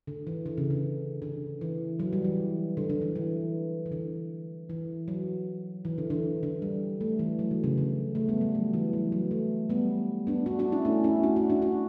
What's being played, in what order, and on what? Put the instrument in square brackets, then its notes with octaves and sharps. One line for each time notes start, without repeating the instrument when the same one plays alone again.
[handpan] D3
E3
D3
C#3
D3
D3
E3
F#3
G3
E3
D3
D3
E3
E3
E3
D3
E3
F#3
E3
D3
D3
D3
G3
A3
E3
F#3
D3
C#3
D3
A3
G3 B3
G3
F#3
E3
F#3
F#3
A3
G3 B3
B3 D4
D4 F#4
D4 F#4
C#4 E4
A3 C#4
C#4 E4
D4 F#4
D4 F#4
D4 F#4
D4 F#4